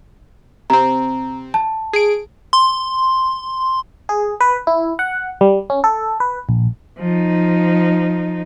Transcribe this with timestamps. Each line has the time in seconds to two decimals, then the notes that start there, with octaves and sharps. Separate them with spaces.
0.70 C3 C4 A#5
1.54 A5
1.93 G#4 D7
2.53 C6
4.09 G#4
4.41 B4
4.67 E4
4.99 F#5
5.41 G3
5.70 C#4
5.84 A4
6.20 B4
6.49 A#1
6.99 F3 D#4